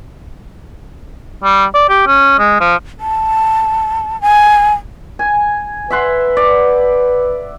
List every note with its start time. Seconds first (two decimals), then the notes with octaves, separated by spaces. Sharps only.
1.44 G3
1.74 D5
1.89 G4
2.07 C#4
2.39 G#3
2.60 F3
3.00 A5
4.21 G#5
5.19 G#5
5.90 B4 E5 F#5 C6
6.37 D5